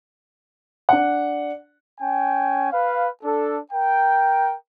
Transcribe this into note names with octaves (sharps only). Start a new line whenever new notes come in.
D4 F#5
C#4 G5 G#5
B4 F5
D4 A4
A#4 G5